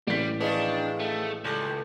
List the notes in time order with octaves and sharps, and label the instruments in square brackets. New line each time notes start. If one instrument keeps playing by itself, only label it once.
[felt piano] A1 B6 [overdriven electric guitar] G3
[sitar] D#3 F3 G#4 [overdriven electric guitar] D4 [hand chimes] B4 D#5 F5
[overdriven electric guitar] A3
[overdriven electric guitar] C#2 [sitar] G3 [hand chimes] A4 A5 C#6